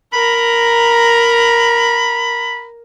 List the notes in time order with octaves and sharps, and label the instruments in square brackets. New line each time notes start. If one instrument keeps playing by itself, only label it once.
[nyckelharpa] A#4 A#5 [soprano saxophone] B5